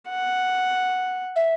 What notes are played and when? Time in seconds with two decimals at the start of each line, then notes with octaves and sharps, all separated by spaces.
0.09 F#5
1.36 E5